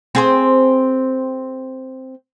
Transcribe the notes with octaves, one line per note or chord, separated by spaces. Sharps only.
C4 G#4 C5